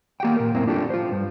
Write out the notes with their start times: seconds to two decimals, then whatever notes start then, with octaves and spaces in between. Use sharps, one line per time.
0.20 A#3 G4 F#5 G5
0.36 A#2 A#4
0.54 F#2 A2 C4 E4 A#4
0.67 D4 F4 G4 A4
0.90 F4 C5
1.12 G2